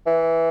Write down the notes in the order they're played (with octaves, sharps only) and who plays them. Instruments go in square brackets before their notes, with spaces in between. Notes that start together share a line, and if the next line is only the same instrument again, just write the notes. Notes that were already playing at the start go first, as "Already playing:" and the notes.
[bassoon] E3